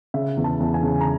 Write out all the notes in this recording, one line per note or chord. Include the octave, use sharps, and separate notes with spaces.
C#3 E5
E2
A5
E2
G#5
C#3
A#5